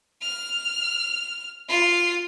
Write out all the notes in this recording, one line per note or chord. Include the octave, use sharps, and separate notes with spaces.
F6
F4 C7